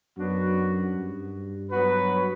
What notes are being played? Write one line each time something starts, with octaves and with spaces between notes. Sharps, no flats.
F#2 F#3 B3 D4 F#4
G2
F#3 B3 F#4 B4